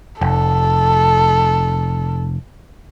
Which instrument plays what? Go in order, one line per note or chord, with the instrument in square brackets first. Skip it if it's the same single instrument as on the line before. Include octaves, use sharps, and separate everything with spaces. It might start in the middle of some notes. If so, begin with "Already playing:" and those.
[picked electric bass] F1 [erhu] A4